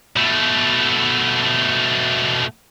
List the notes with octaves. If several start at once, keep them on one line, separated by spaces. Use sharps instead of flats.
B2 A3